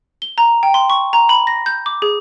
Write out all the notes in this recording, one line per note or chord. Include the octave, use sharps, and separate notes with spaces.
G7
A#5
G5
C6
C#6
A#5
B5
A#6
G6
D6
G#4